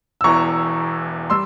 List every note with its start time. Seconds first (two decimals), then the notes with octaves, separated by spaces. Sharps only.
0.21 E6
0.24 E1 E2 E3 A#5 C#6
1.30 G3 C6 E6